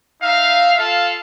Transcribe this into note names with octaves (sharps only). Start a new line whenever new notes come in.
D#4 E5 F5
F4 A4 F5